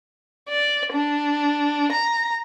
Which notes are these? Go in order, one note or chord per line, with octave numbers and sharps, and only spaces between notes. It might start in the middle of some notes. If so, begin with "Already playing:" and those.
D5
D4
A#5